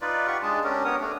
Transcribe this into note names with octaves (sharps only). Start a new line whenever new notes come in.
D#4 F4 B4 D5
F4 G4 F#5 C#6
G#3 D4 G#4 A5
C#4 D4 G4 A#4
B3 A#4 C#5 D#6
A3 D4